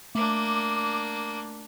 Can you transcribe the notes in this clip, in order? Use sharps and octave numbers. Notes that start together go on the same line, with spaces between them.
A3 A#3 D4 D6